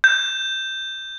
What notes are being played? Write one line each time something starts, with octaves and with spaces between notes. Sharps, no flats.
G6